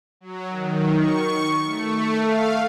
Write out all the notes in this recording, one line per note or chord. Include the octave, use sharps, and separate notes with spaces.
F#3
D#3
C#6
A3
F5